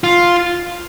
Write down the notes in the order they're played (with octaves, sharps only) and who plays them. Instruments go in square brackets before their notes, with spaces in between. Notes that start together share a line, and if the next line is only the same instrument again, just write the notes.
[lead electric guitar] F4